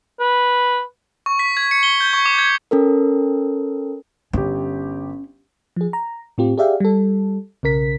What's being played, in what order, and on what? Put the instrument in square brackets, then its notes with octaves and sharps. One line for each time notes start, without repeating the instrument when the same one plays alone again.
[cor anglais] B4
[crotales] C#6
B6
G#6
C#7
G7
G6
C#6
D6
G#6
[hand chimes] C#4 A4 A#4
[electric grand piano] G1 G4 [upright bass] C#4
[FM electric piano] F3 G#4
A#5
A2 C4 F4 G4
G4 G#4 D5 E5 F5 G5
G3 A4
B1 C#3 A#4 B6